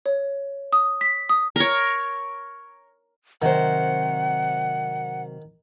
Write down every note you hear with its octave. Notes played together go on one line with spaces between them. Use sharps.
C#5
D#6
B6
D#6
A#4 C#5
C3 D#3 F#3 C5 F#5